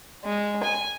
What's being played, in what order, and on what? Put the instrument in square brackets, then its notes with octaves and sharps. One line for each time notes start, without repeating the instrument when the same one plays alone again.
[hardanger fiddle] G#3
G#5